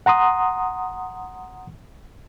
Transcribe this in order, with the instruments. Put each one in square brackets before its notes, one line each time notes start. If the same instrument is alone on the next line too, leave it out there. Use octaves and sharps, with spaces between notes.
[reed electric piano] F#5 A#5 C6 D#6